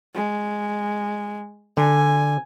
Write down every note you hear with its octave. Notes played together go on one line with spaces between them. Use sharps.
G#3
D3 G#5